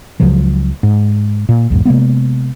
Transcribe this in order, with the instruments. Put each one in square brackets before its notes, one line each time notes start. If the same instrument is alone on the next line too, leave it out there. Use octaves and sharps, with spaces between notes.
[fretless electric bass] C#2 C#3 F3 F#3
G#2
A#2
B1 E2 G#2
C3 G#3 A#3 B3